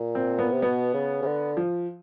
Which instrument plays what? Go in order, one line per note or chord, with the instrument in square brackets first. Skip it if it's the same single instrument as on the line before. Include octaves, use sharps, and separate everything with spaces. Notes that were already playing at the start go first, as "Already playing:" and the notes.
Already playing: [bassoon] A#2
[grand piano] C4
B3
[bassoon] C3
[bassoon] B2 [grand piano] B3
[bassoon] C#3
C#3
D3
[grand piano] F3